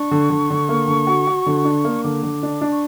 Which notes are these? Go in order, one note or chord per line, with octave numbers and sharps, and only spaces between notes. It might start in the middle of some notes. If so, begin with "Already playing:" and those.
Already playing: D4 C#6
D3
D3
D3
A#3
D3
F#4
F#4
D3
D4
A#3
D3 D6
D3
D4
D4
C#6